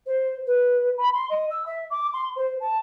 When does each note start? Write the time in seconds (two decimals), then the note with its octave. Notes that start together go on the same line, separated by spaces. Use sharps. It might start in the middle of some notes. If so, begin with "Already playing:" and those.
0.06 C5
0.46 B4
0.97 B5
1.13 C6
1.29 D#5
1.50 E6
1.66 E5
1.90 D6
2.13 C6
2.36 C5
2.60 A5